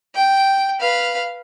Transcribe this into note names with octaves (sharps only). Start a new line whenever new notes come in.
G5
B4 F5